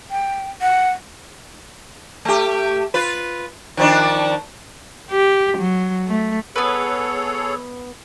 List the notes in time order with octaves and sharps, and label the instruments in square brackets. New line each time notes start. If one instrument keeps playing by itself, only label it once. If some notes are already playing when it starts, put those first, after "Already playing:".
[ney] G5
F#5
[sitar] A3 G4
F4 B4
D#3 F3 D4
[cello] G4
F#3
A3
[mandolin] B3 B4 [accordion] G#4 A4 C#5